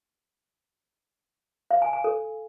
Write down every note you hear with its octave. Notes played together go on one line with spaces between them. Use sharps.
F5
G#5
G#5
A4